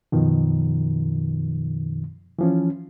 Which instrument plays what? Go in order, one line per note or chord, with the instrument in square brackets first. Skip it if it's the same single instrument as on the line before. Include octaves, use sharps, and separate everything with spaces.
[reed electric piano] F#2 B2 D#3 F3
E3 F3 C#4